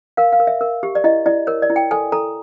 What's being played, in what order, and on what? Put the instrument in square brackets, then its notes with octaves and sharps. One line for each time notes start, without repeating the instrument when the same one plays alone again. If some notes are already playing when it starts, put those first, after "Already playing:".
[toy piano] A#4 F5
F5
A#4
E5
A#4
G4
D5
E4 D#5
E4 D5
A#4 C#5
D5
E4
G5
A4 G#5
A4 A#5